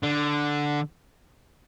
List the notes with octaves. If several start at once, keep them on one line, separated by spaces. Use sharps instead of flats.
D3